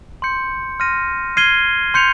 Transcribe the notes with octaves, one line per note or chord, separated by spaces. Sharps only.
C6 G6 C#7
C6 F6 A#6 D#7
F6 G#6 C7 D#7 G7
C6 G6 C#7 F7